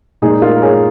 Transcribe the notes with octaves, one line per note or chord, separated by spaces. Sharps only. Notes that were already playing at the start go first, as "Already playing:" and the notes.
A#2 G#3 D#4 G#4
F4 A#4
A#4
G#4 C#5